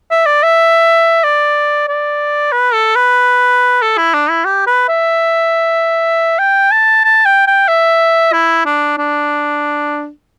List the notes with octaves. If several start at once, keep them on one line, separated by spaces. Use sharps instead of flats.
E5
D5
E5
D5
D5
B4
A4
B4
A4
E4
D4
E4
G4
B4
E5
G5
A5
A5
G5
G5
E5
E4
D4
D4